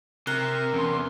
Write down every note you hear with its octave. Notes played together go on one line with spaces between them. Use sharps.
C3 A#4 F#6 G7
E2 C#4 C6